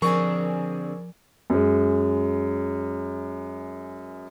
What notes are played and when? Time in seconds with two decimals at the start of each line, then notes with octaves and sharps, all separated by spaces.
0.02 D3 F3 C4 G#4 A#4 D5 G#5 C#6
1.50 F#2 G#3